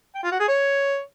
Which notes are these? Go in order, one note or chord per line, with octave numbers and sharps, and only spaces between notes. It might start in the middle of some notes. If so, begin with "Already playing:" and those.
G5
F4
F#4
G#4
C#5